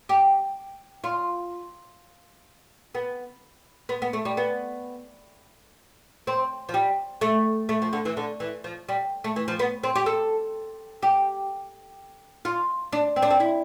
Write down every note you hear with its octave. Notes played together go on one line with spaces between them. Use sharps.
G4
F4
B3
B3
B3
A3
G3
B3
C4
F3
G3
A3
A3
F3
D3
E3
D3
E3
F3
G3
A3
E3
F3
B3
C4
G4
A4
G4
F4
D4
C4
D4
C4
E4